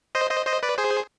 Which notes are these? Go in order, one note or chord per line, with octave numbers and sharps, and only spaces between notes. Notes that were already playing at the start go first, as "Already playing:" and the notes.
C5 D#5
C5 D#5
C5 D#5
B4 D5
G#4 C5